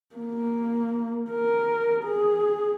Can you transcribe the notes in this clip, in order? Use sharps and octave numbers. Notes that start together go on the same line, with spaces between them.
A#3
A#4
G#4